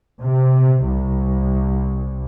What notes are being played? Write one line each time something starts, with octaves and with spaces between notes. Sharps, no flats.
C3
C2